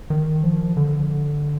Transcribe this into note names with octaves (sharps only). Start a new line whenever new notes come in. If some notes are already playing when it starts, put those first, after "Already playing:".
D#3
F3
D3